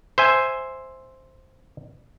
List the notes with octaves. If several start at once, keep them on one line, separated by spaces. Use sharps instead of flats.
C5 E5 G#5